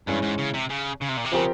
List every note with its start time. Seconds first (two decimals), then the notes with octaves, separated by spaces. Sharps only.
0.08 G2 E3 G#3 C#4
0.23 G#2
0.39 C#3
0.54 C3
0.70 C#3
1.01 C#3
1.09 C3
1.17 A#2
1.25 C3
1.32 C#3 F3 C4 G4 A#4